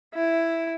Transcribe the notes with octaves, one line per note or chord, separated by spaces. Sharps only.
E4